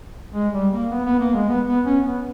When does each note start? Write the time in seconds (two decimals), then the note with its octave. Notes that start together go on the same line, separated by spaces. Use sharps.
0.34 G#3
0.53 G3
0.72 A#3
0.91 B3
1.05 B3
1.19 A#3
1.34 G#3
1.48 B3
1.67 B3
1.86 C#4
2.05 B3